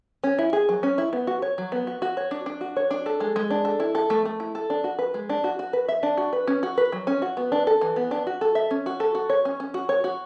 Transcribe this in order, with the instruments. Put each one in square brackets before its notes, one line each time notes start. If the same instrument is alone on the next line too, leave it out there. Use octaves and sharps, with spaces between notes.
[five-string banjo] C#4
E4
G#4
F#3
C#4
E4
B3
F#4
C#5
F#3
B3
F#4
F#4
C#5
D4
D4
F#4
C#5
D4
A4
G#3
G#3
D4
A4
E4
A4
A3
A3
E4
A4
D4
F#4
B4
G#3
D4
F#4
F#4
B4
E5
D4
F#4
B4
C#4
F#4
B4
F#3
C#4
F#4
B3
D4
A4
E3
B3
D4
F#4
A4
E5
C#4
F#4
A4
F#4
C#5
C#4
C#4
F#4
C#5
F#4